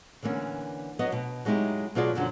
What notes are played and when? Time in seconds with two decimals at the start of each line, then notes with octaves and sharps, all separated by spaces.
0.23 D3 E3 A#3 C#4
0.99 F#3 B3 D#5
1.12 B2
1.45 F#3 G#3 B3 D#4 E4 G4
1.95 B2 F#3 F4 G#4 D5
2.15 F#2 B2 D3 F3 F#3 C#4